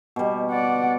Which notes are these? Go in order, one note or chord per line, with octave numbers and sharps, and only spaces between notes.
B2 G3
D5 F#5